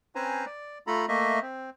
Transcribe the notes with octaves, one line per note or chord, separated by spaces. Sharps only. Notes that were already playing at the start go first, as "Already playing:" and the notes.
C4 C#4 B4 C5 G#5 A#5
D5
A3 F4 A4 A#5 B5
A3 A#3 D#5 E5
C4